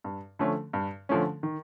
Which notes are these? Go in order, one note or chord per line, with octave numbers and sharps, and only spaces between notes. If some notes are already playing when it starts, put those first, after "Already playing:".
G2
D3 F3 A3 C#4
G2
D3 F3 A3 C#4
D#3